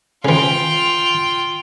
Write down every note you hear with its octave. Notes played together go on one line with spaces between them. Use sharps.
C#3 E3 F4 G5